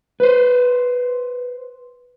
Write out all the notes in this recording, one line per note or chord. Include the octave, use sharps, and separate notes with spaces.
B4 C5